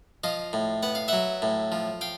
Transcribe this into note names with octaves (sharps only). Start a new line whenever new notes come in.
F3 D#5 F5
A2
B3 F#5
F5
F#3 E5 F#5
A2
F3
F5 G5